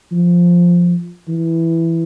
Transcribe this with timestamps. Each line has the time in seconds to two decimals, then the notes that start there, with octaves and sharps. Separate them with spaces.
0.12 F3
1.29 E3